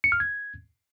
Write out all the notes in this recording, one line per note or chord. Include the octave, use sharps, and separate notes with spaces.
C#7
F6
G#6